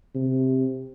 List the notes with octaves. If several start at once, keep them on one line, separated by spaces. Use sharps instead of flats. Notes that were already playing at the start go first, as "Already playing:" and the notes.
C3